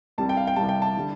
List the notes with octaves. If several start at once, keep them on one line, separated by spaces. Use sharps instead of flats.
C2 C3 G3 A5
G5
F5
G5
C2 C3 G3 A5
G5
A5
D3 G3